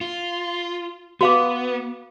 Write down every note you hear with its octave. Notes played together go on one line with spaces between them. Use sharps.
F4
B3 F#4 F5 D6